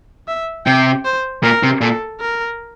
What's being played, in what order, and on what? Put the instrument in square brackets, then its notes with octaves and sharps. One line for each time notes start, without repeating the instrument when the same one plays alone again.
[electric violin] E5
[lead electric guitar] C3 [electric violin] G5
[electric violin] C5
[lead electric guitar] A#2 [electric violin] A#4
[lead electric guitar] C3
[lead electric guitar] A#2 [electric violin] A4
[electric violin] A#4